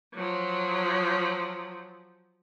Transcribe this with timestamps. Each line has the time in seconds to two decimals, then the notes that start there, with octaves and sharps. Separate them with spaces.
0.14 F3 F#3